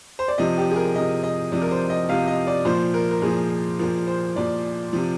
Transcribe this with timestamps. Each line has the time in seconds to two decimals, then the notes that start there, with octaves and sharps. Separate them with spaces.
0.19 C5
0.28 D5
0.38 C3 F3 D#5
0.58 G4
0.71 G#4
0.76 A#4
0.95 C3 F3 D#5
1.23 D#5
1.52 C3 F3 D5
1.62 A#4
1.71 C5
1.90 D#5
2.09 C3 F3 F5
2.28 D#5
2.47 D5
2.65 A#2 F3 C5
2.94 A#4
3.11 A#4
3.22 A#2 F3 G#4
3.79 A#2 F3 A#4
4.07 C5
4.36 A#2 F3 D5
4.93 C3 F3